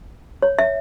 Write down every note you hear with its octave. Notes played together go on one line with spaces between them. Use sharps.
C#5
E5